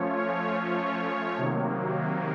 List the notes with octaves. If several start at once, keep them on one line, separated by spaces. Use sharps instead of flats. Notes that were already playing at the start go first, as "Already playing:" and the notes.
Already playing: F3 A3 C#4 F4 C#5
C#5
C#5
C3 D#3 F#3 A#3